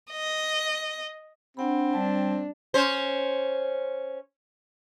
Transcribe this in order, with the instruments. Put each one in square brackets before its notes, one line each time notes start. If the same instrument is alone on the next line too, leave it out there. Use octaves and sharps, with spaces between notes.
[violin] D#5
[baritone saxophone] C4 [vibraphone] D4 F#5 B5
[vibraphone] G3 A5 [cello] D4
[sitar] C#4 C5